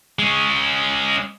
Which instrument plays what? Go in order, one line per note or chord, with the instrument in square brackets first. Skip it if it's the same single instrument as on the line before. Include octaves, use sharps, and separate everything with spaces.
[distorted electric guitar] G#3 C#4